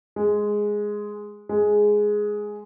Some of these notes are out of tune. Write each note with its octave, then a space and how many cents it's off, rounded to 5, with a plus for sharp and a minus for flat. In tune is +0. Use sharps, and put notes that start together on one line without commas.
G#3 +0
G#3 +5